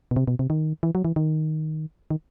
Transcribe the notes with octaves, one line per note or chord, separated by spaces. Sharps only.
B2
C3
B2
C3
D#3
E3
F#3
E3
D#3
D#3